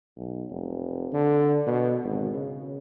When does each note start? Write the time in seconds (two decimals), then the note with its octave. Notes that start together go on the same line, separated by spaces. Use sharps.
0.17 B1
0.51 F1
1.13 D3
1.67 B2
2.04 G#1
2.34 C#3